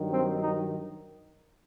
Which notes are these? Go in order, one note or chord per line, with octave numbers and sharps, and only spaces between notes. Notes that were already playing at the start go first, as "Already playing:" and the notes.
Already playing: G2 D#3 F#3
C4
D#4